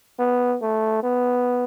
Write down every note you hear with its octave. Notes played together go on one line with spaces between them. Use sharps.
B3
A3
B3